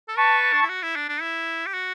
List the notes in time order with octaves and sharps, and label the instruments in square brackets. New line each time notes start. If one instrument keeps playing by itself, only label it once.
[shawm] A4
[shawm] B4 [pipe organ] A5 C#6
[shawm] D4
E4
F#4
E4
D4
D4
E4
G4
F#4